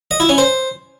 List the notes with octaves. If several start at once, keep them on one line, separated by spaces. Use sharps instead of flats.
D#5
E4
C#4
C5